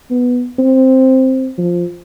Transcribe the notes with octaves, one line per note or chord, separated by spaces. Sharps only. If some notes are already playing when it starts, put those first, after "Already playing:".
B3
C4
F3